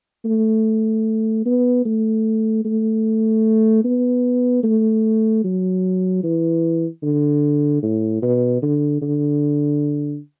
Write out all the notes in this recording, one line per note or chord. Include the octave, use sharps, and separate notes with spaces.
A3
B3
A3
A3
B3
A3
F#3
E3
D3
A2
B2
D3
D3